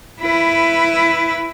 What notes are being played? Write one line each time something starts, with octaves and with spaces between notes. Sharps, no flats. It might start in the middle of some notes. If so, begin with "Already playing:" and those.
E4 B4